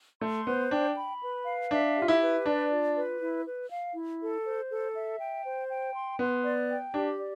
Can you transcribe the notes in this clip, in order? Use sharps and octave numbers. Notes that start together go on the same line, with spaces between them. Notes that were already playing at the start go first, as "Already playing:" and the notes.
A3 C6
B3 C5
D4 G5
B5
B4
F5
D4 E5
G4
F4
E4
B4
D4 D5
F4
B4
E4
B4
F5
E4
A4
C5
A4
E5
G5
C5
G5
C6
B3 C6
D5
G5
D4 G4
D5